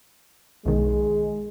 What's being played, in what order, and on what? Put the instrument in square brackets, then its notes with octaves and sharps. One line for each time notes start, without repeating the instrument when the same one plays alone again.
[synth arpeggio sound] B1 D#3 [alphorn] G#3